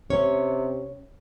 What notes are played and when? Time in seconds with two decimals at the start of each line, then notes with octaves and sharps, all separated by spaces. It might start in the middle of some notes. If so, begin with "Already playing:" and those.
0.10 C3 C#4 C#5